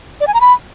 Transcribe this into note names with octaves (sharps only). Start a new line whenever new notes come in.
D5
G#5
A#5
B5